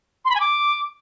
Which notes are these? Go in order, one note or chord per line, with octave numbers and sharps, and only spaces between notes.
C6
B5
G#5
D6